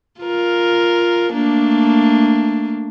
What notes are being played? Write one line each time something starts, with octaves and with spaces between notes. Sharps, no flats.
F4 A#4
A3 A#3 D4